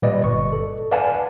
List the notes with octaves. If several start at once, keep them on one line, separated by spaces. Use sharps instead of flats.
A#2 G3 B4 D5 D#5
G1 C#6
A4
B4 D5 F5 F#5 G#5 A5